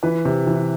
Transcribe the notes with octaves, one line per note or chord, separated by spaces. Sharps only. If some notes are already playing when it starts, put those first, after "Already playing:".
E3 B4
C3
E3